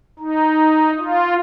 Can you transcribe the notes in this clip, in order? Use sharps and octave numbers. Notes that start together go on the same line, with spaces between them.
D#4
F4